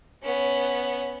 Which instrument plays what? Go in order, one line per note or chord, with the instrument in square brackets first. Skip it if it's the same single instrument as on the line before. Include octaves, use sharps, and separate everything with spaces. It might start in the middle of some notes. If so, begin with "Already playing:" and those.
[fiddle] B3 C#4